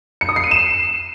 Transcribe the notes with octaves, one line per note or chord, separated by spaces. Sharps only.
C#7
D#6
C7
D#7
E7